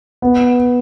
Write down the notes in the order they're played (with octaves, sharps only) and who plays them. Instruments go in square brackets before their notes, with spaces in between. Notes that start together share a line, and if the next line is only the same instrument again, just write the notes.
[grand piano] B3